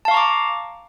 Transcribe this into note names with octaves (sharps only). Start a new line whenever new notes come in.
F5 A5 A#5 C#6 D6